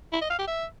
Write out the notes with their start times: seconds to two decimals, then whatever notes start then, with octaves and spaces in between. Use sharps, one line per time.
0.12 E4
0.21 D#5
0.30 F5
0.39 G4
0.48 E5